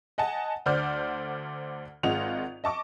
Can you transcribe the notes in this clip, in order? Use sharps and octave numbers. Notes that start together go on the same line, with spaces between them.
D#5 F#5 G#5 A5
D2 D3 C5 D5 F6 G6
G#1 G#3 F4 D#5 F#5 F7
D#5 A5 C#6 D6